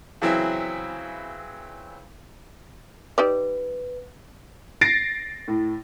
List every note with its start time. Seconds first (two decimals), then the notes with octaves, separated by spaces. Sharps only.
0.22 C#3 E3 F#3 C4 E4
3.18 D#4 G4 B4 D5
4.81 A6 A#6 C7 D7
5.48 A2